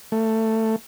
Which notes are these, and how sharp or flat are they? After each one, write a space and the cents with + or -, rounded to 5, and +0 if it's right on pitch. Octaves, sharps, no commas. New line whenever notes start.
A3 +15